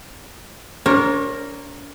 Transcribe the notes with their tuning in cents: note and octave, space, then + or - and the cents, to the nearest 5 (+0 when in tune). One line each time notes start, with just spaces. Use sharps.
D4 -45 A#4 +0 C#5 -45